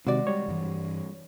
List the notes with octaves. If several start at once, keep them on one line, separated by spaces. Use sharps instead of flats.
C3 D#3 G#3 F#4 D5
G3 C#5
G2 E3